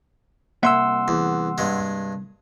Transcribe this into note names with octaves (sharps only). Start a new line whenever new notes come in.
C2 A#3 E5 F#5 C6 E6
E2
G2 G#3